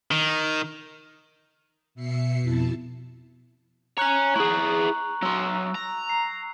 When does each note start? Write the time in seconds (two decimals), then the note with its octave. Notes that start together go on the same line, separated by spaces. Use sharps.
0.11 D#3
1.95 B2 E5 C7 C#7
2.41 F2 B2 E4 A5
3.98 C#5 G#5 A#5 F#6 F#7
4.36 E4 G#4 C#6
5.23 F#3 C6 E6
5.75 A#5
6.09 C7